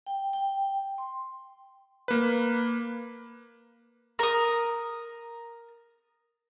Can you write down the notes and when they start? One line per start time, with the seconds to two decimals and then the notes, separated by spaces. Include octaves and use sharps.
0.06 G5
0.33 G5
0.98 C6
2.08 A#3 B4
4.19 A#4 D#6